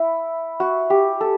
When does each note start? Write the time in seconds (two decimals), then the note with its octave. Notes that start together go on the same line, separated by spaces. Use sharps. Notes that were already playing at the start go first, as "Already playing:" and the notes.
Already playing: E4
0.60 F#4
0.90 G4
1.21 A4